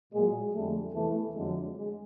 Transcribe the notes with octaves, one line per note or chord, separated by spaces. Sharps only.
A#2 F#3 G#3
F2 D3 G3 A3
E2 C3 E3 A3
F2 D3 F#3 G#3
G#3